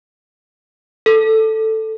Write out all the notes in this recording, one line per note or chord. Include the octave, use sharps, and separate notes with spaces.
A4